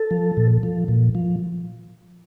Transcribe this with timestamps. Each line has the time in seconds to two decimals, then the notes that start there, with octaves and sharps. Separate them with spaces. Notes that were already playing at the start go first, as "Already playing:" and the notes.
Already playing: A4
0.11 F3
0.37 A#2
0.63 F3
0.88 A#2
1.15 F3